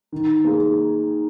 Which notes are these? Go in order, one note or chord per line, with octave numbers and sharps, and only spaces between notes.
D#3
A#3 D#4 G#4